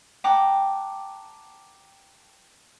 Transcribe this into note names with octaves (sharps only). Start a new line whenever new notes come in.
F#5 G5 A5 A#5 D6